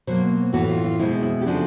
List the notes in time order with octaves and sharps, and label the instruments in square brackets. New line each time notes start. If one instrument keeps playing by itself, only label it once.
[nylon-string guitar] B2 F#3 A#3 C5
A2 E3 A3 F#4
F4
F4
B2 G#3 C4 E4
E4
G4
C#3 F3 A3 D4 F#4